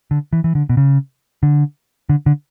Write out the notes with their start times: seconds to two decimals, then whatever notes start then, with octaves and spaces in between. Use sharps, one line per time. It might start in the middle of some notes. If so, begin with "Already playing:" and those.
0.11 D3
0.33 E3
0.44 E3
0.55 D3
0.69 B2
0.77 C#3
1.43 D3
2.09 D3
2.26 D3